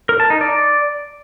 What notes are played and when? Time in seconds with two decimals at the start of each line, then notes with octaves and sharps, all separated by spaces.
0.09 A#4
0.20 A5
0.30 D#4
0.41 D5